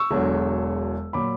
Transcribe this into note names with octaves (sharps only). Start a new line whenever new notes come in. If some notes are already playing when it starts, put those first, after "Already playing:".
Already playing: C#6 E6
E1 E2 D3 F#3
A#2 F#3 B5 D6